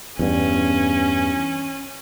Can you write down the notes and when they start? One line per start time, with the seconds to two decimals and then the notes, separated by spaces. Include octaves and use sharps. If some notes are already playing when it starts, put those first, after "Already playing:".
0.19 E2 G2 C#4